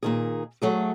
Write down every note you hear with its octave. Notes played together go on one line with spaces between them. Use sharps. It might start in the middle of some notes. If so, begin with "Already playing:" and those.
A#2 D#3 G#4
F#3 A3 G#4